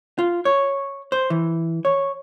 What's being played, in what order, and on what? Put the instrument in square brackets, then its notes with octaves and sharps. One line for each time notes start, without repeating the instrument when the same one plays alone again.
[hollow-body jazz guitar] F4
C#5
C5
E3
C#5